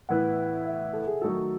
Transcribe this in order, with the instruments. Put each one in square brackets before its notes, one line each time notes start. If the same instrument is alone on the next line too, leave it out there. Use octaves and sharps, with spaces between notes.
[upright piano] A2 E3 B3 E4 B4 [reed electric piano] F#5
[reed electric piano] E5
A4
G#4
[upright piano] D#3 F#3 A3 D#4 A4 [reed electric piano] F#4